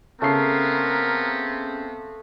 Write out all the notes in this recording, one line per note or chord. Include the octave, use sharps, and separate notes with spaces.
C#3 A3 B3 C4 A#4 C7